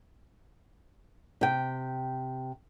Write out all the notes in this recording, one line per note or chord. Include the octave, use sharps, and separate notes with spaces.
C3 G5